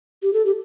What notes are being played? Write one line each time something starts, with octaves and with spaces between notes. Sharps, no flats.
G4
A4
G4